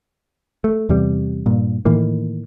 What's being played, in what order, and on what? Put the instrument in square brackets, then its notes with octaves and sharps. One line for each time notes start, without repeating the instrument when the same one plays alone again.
[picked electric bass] A3
E2 C3 G3
G2 A#2
A2 D#3 E3 A#3